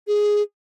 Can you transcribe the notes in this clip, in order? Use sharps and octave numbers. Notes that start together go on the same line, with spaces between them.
G#4